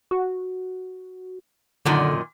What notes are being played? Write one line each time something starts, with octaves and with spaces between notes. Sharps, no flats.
F#4
F#2 A#2 D3 D#3